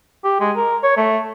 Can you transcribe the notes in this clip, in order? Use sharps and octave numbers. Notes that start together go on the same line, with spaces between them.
G4
G#3
A#4
C#5
A3